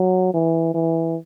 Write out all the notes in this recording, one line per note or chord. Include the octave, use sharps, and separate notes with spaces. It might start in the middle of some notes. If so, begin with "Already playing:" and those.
Already playing: F#3
E3
E3